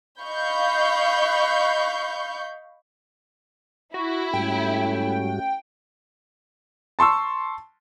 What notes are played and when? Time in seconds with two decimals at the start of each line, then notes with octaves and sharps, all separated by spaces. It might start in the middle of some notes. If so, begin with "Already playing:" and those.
0.22 D#5 F5 B5 C#6 G6
3.94 E4 F#4
4.34 G#2 G3 A3 C#4 F#4 G5
6.99 A5 C6 C#6 E6